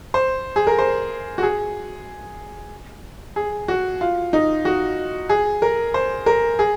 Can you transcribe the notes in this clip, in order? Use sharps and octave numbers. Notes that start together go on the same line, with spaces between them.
C5
G#4
A#4
C5
F#4
G#4
G#4
F#4
F4
D#4
F#4
G#4
A#4
C5
A#4
G#4